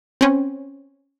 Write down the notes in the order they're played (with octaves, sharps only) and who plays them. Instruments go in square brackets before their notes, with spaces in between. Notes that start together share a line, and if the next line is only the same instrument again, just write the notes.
[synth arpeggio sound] C4 C#4